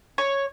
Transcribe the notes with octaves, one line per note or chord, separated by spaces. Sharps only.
C#5